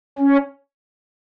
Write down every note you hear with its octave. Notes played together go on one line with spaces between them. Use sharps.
C#4